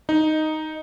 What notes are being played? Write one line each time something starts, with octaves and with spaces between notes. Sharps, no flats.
D#4